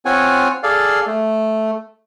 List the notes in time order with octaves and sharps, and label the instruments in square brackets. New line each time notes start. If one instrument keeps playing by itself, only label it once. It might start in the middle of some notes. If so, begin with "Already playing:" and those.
[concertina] C4 F4 C#5 F#5 G#5
G#4 A4 D5 F5
A3